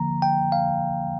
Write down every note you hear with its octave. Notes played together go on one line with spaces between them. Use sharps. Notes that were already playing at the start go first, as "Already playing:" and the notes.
Already playing: D3 F3 A#3 A#5
G5
F5